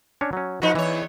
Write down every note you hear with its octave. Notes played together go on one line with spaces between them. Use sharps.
C#4 D4 C#5
F#3 C#4
F3 D#4 F#4 B4 C5
E2 E3 C#5